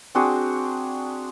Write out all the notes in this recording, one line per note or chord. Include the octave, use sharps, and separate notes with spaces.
C4 D4 F#4 G#4